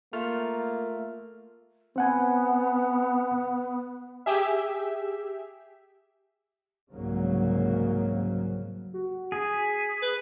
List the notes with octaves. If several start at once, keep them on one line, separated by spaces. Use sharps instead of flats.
A3 A#3 F4 F6
B3 C4 F#5 G#5
G4 G#4 E5
C2 G#2 C#3 F#3 A#3
F#4
G#4
B6
B4